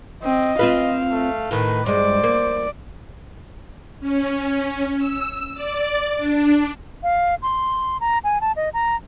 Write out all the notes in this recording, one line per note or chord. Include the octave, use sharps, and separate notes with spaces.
C4 D#5
C4 F4 B4 F5
A3
A2 D#3 B4
G2 G#3 C5 D5
A#3
C#4
E6
D5
D4
F5
C6
A#5
G#5
A5
D#5
A#5